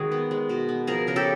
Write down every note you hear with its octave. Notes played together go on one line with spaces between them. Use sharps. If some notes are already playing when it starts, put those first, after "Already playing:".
Already playing: D#3 G#3 F#4 G#4
B3
G#3
B2
B3
F3 G#4 A#4
C#3 A#4
G4 A4